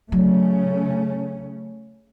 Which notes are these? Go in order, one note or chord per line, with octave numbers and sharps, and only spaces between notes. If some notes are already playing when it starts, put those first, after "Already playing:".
C#3 F#3 A3 C#4